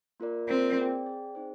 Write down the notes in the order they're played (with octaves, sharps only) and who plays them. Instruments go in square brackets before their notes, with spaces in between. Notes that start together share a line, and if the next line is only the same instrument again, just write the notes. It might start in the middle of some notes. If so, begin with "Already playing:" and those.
[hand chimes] A#3 F4 A#4 D5
[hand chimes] A#3 F4 A#4 D5 [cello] C4
[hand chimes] G#4 D5 G5
G#4 D5 G5
C4 D#4 G#4 C5